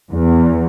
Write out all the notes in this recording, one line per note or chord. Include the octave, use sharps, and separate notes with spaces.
E2